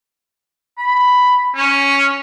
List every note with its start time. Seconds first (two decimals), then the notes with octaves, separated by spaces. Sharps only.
0.78 B5
1.56 C#4